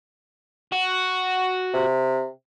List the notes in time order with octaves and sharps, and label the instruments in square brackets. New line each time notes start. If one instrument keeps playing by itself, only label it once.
[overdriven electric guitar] F#4
[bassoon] C3